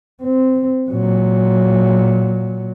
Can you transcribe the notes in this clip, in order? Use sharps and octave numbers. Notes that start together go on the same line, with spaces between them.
C4
A#2 F#3